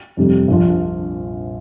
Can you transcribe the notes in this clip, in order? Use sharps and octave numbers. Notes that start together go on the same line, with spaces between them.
F2 C3 G3
A#1 A#2 F3 D4 F4